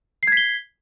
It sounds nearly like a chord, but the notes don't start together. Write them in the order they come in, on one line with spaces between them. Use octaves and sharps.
C7 G#6 B6 G7